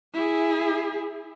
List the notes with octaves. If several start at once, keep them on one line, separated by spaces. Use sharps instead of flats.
E4 G#4